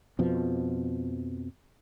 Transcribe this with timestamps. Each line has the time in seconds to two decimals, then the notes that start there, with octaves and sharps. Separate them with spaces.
0.19 F2 B2 F3